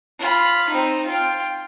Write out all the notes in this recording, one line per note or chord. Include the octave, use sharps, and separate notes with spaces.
F4 B5
C4 D#4
F4 G5